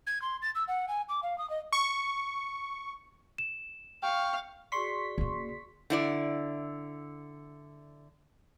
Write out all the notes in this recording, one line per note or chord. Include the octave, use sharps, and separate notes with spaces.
G#6
C6
A6
E6
F#5
G#5
D6
F5
D#6
D#5
C#6
E7
F5 G5 C#6
F#4 G#4 D5 C6 C#6 B6
C#3 A#3
D3 E4 D5